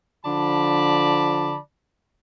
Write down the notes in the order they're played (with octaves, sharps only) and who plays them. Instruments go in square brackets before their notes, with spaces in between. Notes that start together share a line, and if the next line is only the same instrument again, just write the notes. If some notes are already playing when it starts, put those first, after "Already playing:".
[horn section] D3 F3 D5 A5 B5